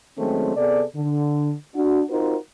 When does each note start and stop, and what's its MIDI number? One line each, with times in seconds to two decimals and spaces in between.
0.18 0.53 51
0.18 0.53 54
0.18 0.53 56
0.18 0.53 57
0.18 0.53 60
0.18 0.53 61
0.57 0.83 48
0.57 0.83 59
0.57 0.83 68
0.57 0.83 69
0.57 0.83 74
0.96 1.52 50
1.75 2.03 62
1.75 2.03 66
2.10 2.36 60
2.10 2.36 63
2.10 2.36 65
2.10 2.36 66
2.10 2.36 70
2.10 2.36 72